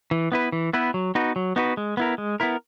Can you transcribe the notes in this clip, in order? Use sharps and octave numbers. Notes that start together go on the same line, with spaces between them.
E3
B3 E4 B4
E3
B3 E4 B4
F#3
B3 D#4 F#4 B4
F#3
B3 D#4 F#4 B4
G#3
B3 E4 A#4
G#3
B3 E4 A#4